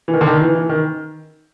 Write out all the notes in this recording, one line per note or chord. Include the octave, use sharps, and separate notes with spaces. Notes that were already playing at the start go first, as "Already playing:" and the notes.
E3
D#3
D3
D#3
E3
E3
D#3